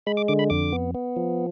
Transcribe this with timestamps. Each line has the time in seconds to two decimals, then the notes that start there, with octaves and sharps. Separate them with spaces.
0.07 G#3 B5
0.17 D6
0.28 D3 D6
0.39 B5
0.50 F2 D6
0.72 B3
0.95 B3
1.16 F3